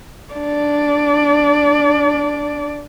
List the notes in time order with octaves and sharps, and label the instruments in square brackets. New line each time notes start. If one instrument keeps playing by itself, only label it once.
[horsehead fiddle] D4 D5